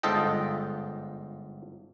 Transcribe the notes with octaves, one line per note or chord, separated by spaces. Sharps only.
G1 G#2 F4 A4 D#5 G5